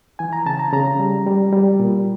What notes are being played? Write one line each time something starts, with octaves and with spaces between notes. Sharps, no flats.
E3 G#5
A#5
C#3 A5
A#5
C#3 A#5
G3
G3
G3
A#2